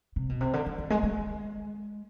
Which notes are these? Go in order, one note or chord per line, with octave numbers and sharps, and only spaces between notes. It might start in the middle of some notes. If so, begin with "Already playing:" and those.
C3
B2
C3
D3
D#3
D#3
G#3
G#3